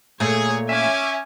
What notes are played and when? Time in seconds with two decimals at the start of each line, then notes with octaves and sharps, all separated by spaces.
0.20 A#2 A3 G#4 C#5
0.69 C#4 E5 G#5 D6